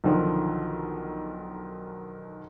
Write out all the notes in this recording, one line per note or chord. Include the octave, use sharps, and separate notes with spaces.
B1 D3 D#3 F3